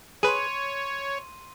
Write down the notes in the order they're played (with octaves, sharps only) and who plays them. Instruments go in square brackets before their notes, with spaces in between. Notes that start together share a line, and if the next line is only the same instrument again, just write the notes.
[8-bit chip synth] G#4 B4 [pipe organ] C#5 [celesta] C6 D#7